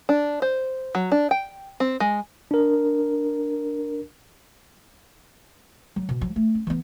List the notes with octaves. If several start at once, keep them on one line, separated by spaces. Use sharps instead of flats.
D4
C5
F#3
D4
G5
C4
G#3
D4 A#4
F#3
B2
F3 F#3
A3
C#4
E3 B3